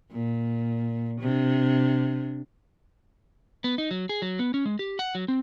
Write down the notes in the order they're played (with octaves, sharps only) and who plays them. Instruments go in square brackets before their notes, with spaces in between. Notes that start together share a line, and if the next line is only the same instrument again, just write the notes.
[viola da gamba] A#2
C3 D4
[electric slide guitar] B3
D#4
F#3
G#4
F#3
B3
C#4
G#3
G4
F#5
F#3
C4